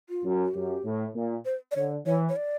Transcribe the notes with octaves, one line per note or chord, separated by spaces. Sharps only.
F4
F#2
F#4
F#2 G4
A2
A#2
C5
D5
D3 C#5
E3 C#5
C#5
D5